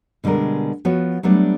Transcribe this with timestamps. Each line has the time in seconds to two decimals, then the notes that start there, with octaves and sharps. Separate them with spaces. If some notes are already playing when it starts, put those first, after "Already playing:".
0.24 B2 D3 G3 G#3 A#4
0.85 F3 B3 F#4 C#5
1.23 F#3 G3 A3 B3 D4